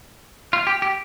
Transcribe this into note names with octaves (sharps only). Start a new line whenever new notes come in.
F4
G4
G4